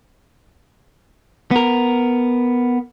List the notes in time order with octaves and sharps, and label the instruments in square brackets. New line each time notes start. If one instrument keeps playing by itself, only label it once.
[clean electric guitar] B3 A#4